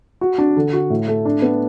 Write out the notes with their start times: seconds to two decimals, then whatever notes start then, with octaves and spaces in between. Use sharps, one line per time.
0.21 F#4
0.38 D4
0.56 D3
0.73 F#4
0.90 A2
1.08 A3
1.25 D4
1.42 B3